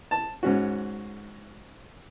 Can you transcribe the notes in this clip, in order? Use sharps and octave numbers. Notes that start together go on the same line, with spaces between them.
A5
G#2 C#4 F#4